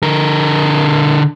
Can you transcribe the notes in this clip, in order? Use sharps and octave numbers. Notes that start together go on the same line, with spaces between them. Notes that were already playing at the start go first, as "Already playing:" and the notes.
D3 A#4